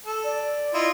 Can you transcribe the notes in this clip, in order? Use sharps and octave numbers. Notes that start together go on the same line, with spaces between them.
A4
D5
E4 F4 D#5